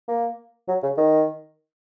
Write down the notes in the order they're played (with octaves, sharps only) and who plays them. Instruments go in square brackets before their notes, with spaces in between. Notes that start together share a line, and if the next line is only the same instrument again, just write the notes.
[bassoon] A#3
F#3
C#3
D#3